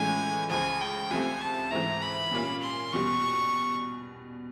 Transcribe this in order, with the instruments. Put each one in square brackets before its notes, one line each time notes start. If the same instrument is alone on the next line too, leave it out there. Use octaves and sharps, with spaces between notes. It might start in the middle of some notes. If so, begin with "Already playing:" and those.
Already playing: [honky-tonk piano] A2 E3 G#3 C#4 [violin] G#5
[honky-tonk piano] C#2 C#3 F3 [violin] G#5
[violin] G5
[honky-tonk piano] C2 C3 F3 A3 C4 [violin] G#5
[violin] A5
[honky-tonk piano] G#2 E3 A3 C4 E4 [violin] A#5
[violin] B5
[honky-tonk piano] A#2 G3 A#3 C#4 F4
[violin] C6
[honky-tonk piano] E2 B2 G3 [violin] C#6